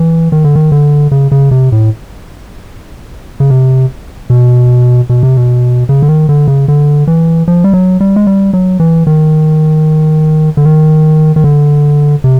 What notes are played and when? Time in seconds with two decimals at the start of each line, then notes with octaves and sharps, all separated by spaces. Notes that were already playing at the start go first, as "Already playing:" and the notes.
Already playing: E3
0.32 D#3
0.44 D3
0.56 D#3
0.72 D3
1.12 C#3
1.32 C#3
1.51 C3
1.72 A2
3.40 C#3
3.50 C3
4.30 B2
5.10 B2
5.23 C3
5.37 B2
5.89 C#3
6.03 D3
6.09 D#3
6.29 D3
6.48 C#3
6.68 D3
7.07 E3
7.48 F3
7.64 G3
7.74 F#3
8.01 G3
8.16 G#3
8.27 G3
8.53 F#3
8.80 E3
9.07 D#3
10.57 D3
10.65 D#3
11.36 D#3
11.44 D3
12.24 C3